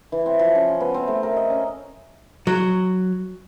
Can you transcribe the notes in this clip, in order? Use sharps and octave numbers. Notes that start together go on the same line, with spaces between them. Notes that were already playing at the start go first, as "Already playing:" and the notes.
E3
C4
F3
C#4
C#6
B3
C4
A3
A#4
D#5
C#4
F#3